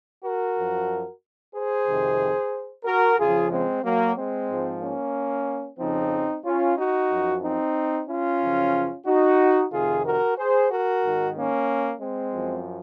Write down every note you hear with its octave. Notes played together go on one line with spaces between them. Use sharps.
F#4 A#4
F#2 F3
G#4 C5
F2 C3 D#3
F#4 A#4
F2 C#3 F3 F4 G#4
G#3 C4
F#3 A#3
G#3 C4
G#2 F3
A#3 C#4
F2 C#3 F3 C4 D#4
C#4 F4
D#4 F#4
F#2 F3
C4 D#4
C#4 F4
F#2 C#3 F3
D#4 F#4
F2 C3 D#3 F4 G#4
F#4 A#4
G#4 C5
F#4 A#4
G#2 D#3
A#3 C#4
G#3 C4
F#2 F3